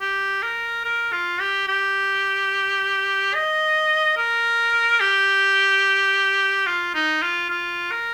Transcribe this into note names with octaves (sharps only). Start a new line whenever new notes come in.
G4
A#4
A#4
F4
G4
G4
D#5
A#4
G4
F4
D#4
F4
F4
A#4